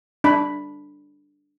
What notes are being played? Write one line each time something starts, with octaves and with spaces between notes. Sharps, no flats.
D4 B5